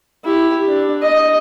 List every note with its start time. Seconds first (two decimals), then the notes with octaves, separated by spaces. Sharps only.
0.24 E4 G4
0.68 D4
1.02 D#5